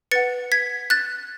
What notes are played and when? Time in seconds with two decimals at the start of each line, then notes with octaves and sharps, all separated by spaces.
0.11 B4 F#5 A6 C#7
0.52 G#6 B6
0.90 F#6 A6